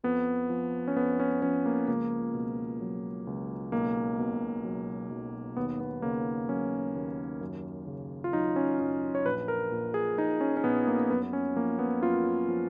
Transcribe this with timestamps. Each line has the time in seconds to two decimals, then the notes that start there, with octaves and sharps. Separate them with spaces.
0.03 F2 B3
0.49 F3
0.88 C#4
0.96 F2 B3
1.20 C#4
1.42 F3 C#4
1.66 A#3
1.88 C#2 A#3
2.34 B2
2.81 F#3
3.27 C#2
3.72 B1 A#3
4.18 B2
4.65 F#3
5.10 B1
5.57 D#2 B3
5.80 B3
6.02 C#3 A#3
6.49 F#3 C#4
6.94 D#2
7.41 F#2
7.87 C#3
8.24 F4
8.33 F#3 D#4
8.56 C#4
8.80 F#2 D#4
9.15 C#5
9.26 A#1 B4
9.48 A#4
9.72 A#2
9.94 G#4
10.17 F3 D#4
10.41 C#4
10.57 C#4
10.64 A#1 B3
10.87 A#3
11.00 A#3
11.10 F#2 B3
11.23 B3
11.33 C#4
11.56 F3 A#3
11.79 B3
12.02 F#2 F4
12.48 F3